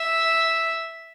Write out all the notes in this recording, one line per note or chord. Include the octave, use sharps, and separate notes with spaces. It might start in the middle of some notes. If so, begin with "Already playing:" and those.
Already playing: E5